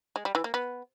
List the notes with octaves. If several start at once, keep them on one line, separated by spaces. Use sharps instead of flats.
G#3
G3
E3
A#3
B3